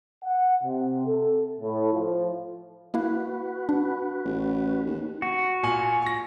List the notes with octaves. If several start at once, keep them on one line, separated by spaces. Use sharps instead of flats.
F#5
C3
A4
A2
F3
A#3 E4 F#4 B4 F5
D4
A1
D#2
F#4
A#2 G#5 F#7
C#6 A#6